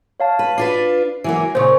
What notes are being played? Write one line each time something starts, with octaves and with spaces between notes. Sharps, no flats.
C#5 F5 A5
B4
D4 F4 B4 C7
E3 F#3 A#3
A#2 C#3 C5 C#6